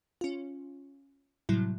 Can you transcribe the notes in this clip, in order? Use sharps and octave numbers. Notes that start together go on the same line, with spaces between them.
C#4 F4
A2 C3 F#3 G3 E4